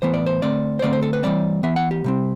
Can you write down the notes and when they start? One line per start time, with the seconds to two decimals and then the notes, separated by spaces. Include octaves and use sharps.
0.02 A2 E3 B3 C5
0.14 D5
0.26 C5
0.42 D3 A3 C4 D5
0.79 C5
0.82 D3 A3 C4 D5
0.93 C5
1.02 A4
1.13 B4
1.23 E3 G3 C4 D5
1.63 E3 B3 E5
1.76 F#5
1.91 G4
2.04 C3 G3 C4